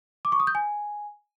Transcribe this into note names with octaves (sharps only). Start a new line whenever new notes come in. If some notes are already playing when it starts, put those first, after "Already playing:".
D6
C#6
D#6
G6
G#5